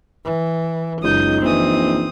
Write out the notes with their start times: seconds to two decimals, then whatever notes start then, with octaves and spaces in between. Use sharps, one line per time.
0.25 E3
1.03 F#1 C#2 D#4 D#6 G6
1.41 A#1 E3 C4 D#6